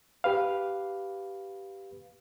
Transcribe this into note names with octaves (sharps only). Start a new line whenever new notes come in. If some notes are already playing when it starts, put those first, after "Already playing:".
G4 B4 F5